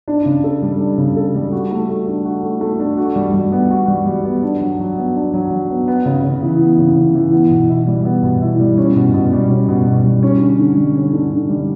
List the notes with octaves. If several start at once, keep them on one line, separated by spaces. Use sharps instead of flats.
D4
C#3
A4
G3
D4
C#3
A4
G3
F#4
A3
A3
D4
F#4
A3
A3
D4
F#4
G3
G3
B3
F#4
G3
G3
B3
D4
F#3
F#3
B3
D4
F#3
F#3
B3
B3
C#3
C#3
E3
B3
C#3
C#3
E3
B3
B2
E4
G3
B3
B2
E4
G3
C#4
B2
B2
G3
C#4
B2
B2
G3
C#4
D3
D3
G3
C#4
D3
D3
G3